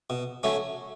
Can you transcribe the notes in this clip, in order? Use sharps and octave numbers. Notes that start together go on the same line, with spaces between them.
B2
F#3 A3 C#4